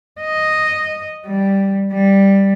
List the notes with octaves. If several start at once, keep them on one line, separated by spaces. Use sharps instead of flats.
D#5
G3
G3